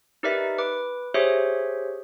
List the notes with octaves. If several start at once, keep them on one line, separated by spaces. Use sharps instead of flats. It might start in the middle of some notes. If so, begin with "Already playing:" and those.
D#4 G4 A#4 B4 D5 E5
B4 D6
G4 G#4 C5 C#5 E5